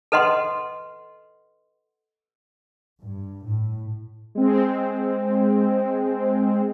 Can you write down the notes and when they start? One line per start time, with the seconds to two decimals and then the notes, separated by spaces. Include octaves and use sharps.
0.12 A4 B4 D#5 F#5 C6
3.01 G2
3.45 A2
4.35 G#3 C4